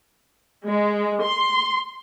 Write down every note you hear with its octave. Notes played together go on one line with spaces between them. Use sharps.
G#3
C6